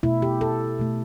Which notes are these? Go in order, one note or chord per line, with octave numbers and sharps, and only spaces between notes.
B2 A3 E4
G4
A4
B2 A3